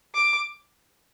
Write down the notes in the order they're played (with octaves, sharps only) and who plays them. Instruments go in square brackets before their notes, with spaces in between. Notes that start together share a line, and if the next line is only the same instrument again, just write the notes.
[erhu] D6